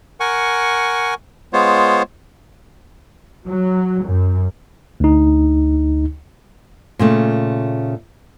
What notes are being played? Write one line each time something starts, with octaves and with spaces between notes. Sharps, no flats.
A#4 F#5 G#5 C#6
G#3 B3 F4 C5 C#5
F#3
F#2
D2 D#4
A#2 C#3 A3